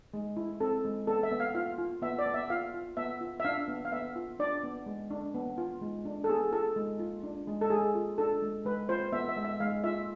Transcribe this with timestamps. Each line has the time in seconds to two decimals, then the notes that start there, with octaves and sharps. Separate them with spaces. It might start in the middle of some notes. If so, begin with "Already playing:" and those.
0.14 G#3
0.37 E4
0.60 C4 A4
0.85 G#3
1.07 B3 A4
1.23 E5
1.31 B3
1.40 F5
1.55 F4 F5
1.78 F4
2.02 B3 E5
2.19 D5
2.26 B3
2.34 E5
2.50 F4 F5
2.74 F4
2.97 B3 E5
3.21 F4
3.40 E5
3.45 D4 F5
3.68 B3
3.85 F5
3.92 B3 E5
4.16 F4
4.39 D4 D5
4.63 B3
4.86 G#3
5.10 D4
5.34 B3
5.58 F4
5.81 G#3
6.05 D4
6.24 A4
6.29 B3 G#4
6.52 F4 A4
6.76 G#3
6.99 F4
7.23 D4
7.48 G#3
7.61 A4
7.70 G#3 G#4
7.95 F4
8.18 D4 A4
8.42 G#3
8.65 G#3 B4
8.89 F4 C5
9.12 B3 E5
9.29 E5
9.37 G#3
9.45 E5
9.60 G#3 F5
9.84 F4 E5